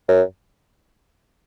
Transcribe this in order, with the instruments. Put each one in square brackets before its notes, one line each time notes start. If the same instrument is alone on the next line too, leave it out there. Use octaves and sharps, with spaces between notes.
[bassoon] F#2